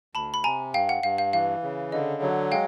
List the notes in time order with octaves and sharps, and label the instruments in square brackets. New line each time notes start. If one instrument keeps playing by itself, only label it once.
[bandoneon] D2 [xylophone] A5 B5
[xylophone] B5
[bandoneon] C3 [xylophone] G#5 A#5
[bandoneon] G2 [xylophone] F5 G5
[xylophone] F#5
[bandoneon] G2 [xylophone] F5
[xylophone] F5
[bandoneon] E3 [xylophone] F5
[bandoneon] C#3
[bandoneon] D3 [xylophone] D#5
[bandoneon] F#3
[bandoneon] G#3 [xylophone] F5 G5